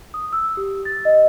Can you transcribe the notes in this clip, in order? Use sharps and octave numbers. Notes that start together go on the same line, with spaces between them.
D#6
E6
G4
A6
D#5